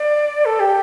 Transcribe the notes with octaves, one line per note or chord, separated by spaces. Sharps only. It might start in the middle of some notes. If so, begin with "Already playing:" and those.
Already playing: D5
A4
G4